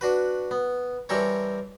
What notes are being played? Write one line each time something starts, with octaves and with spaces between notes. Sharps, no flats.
D4 F#4 B4
B3
E3 G3 C4 A4 A#4 C#5